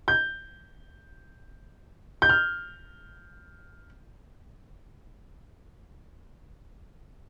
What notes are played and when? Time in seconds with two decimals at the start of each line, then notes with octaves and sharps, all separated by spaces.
0.08 G6
2.22 G6
2.29 F6